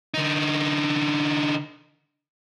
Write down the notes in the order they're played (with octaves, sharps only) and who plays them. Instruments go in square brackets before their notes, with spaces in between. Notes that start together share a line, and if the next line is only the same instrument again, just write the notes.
[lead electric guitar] D3 D#4